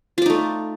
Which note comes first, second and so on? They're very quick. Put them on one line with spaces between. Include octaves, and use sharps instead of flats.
F4 D5 D#4 A3